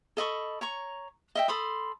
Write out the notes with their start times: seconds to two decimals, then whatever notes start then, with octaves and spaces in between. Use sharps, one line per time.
0.17 A4 D#5 B5 C#6
0.61 C#5 A#5 C#6
1.35 D#5 E5 G5
1.48 A4 B5 C6 D#6